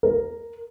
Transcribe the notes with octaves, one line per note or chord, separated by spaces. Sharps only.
A#4